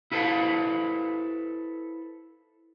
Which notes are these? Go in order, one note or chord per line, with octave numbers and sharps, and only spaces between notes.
E4 F4 A4 B4 C5 F5